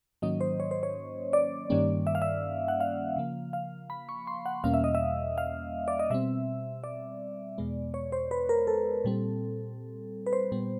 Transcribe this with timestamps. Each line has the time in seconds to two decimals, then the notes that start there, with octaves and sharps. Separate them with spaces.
0.22 G#2 D#3 F#3 A#3 C#4 D#5
0.41 C5
0.60 C#5
0.71 C5
0.83 C#5
1.33 D5
1.70 G2 D#3 G3 A#3 C#4
2.07 E5
2.15 F5
2.22 E5
2.68 F#5
2.80 F5
3.16 C#3 F3 A#3
3.53 F5
3.90 B5
4.09 C#6
4.27 C6
4.46 F#5
4.64 E2 B2 G3 A#3 C#4 F5
4.74 E5
4.84 D#5
4.95 E5
5.38 F5
5.88 D5
5.99 D#5
6.10 B2 G3 C4 E5
6.84 D5
7.58 E2 B2 G#3 B3
7.94 C#5
8.12 C5
8.31 B4
8.49 A#4
8.67 A4
9.05 A#2 G3 C4
10.26 B4
10.33 C5
10.52 A#2 G3 B3